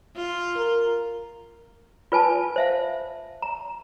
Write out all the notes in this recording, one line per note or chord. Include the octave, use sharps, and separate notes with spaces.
F4
A#4
F4 B4 G#5 A5
C5 E5 F5
A#5